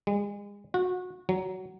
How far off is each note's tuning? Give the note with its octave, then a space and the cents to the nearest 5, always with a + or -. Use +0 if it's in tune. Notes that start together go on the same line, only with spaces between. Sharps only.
G#3 -35
F#4 -25
F#3 +10